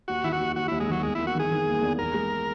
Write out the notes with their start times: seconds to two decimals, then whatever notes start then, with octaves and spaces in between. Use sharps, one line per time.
0.08 D#2 F#4
0.24 D#3 E4
0.32 F#4
0.40 D#2
0.56 D#2 F#4
0.68 D#2 E4
0.80 G#3
0.88 D#3 F#3
1.03 E2 G#3
1.15 A#3 E4
1.27 F#4
1.35 D#3 G#4
1.51 D#3
1.67 A#3
1.82 E2
1.98 E2 A#4
2.14 G#3